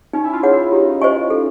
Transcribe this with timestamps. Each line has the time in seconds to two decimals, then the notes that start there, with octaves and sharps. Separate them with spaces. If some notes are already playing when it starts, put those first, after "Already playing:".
0.13 C#4 D#4
0.24 E4
0.33 F4
0.43 G#4 C#5 F#5
0.53 E4
0.72 D#4 G4
1.01 C5 D#5 G#5 C#6
1.30 A4